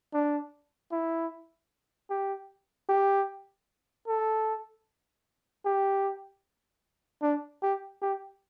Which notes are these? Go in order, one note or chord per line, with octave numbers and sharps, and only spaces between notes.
D4
E4
G4
G4
A4
G4
D4
G4
G4